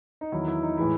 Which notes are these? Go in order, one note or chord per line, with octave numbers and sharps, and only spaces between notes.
D#4
E2 D#3 F#3 E4
E4
D#4
A2 E3 G#3 E4